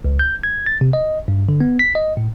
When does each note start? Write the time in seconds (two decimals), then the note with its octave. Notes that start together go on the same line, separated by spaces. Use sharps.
0.05 C#2
0.19 G6
0.43 G#6
0.66 A6
0.81 C3
0.93 D#5
1.28 G2
1.49 D3
1.60 B3
1.79 B6
1.95 D#5
2.17 A2